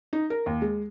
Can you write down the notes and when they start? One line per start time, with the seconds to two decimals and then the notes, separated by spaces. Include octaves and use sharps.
0.13 D#4
0.30 A#4
0.46 D#2
0.62 G#3